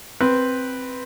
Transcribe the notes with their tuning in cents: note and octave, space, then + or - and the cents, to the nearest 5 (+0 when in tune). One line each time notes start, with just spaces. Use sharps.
C4 +0 B4 +0